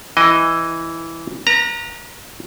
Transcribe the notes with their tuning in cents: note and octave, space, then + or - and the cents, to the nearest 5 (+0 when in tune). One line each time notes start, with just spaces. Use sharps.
E3 +0 D#5 +5
B4 -40 A#5 -10